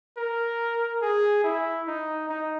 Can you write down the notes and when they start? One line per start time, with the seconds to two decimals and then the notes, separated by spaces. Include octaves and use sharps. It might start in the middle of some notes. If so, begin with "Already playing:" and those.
0.17 A#4
1.02 G#4
1.44 E4
1.88 D#4
2.29 D#4